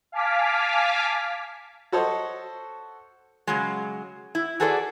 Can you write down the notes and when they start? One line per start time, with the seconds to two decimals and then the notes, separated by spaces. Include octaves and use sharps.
0.12 F5 G#5 A5 D6 F6 B6
1.92 F#4 A4 C5 C#5 D#5
3.47 C#3 F#3 G#3
4.35 E4
4.60 F#4 G#4 A4 B4 C5 D5